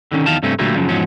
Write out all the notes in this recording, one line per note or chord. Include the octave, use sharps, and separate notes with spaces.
D3 D#3 C#4
E2 D#3 F5 A5
G2 C3 A3 C4 C#4
A#2 D3 F#3 G3 A3 A#3
F#2 C#3 F3 F#3
E2 G#2 F3 F#3 C#4